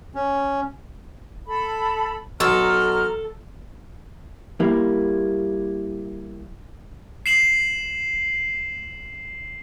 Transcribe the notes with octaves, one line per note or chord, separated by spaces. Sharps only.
C#4
A4 B5
B1 A4 A#5 F6
G3 A#3 E4
C7 E7 F#7